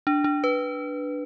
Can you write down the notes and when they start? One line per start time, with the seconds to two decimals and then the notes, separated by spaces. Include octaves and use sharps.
0.07 D4
0.24 D4
0.44 B4